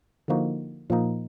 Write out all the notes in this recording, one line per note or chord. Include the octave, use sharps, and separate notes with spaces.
D3 F3 A#3 D#4 F#4
A#2 F3 A#3 D#4